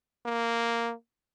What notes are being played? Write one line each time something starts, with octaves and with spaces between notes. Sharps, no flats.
A#3